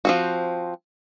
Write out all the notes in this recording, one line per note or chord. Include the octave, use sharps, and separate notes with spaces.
F3 C4 F#4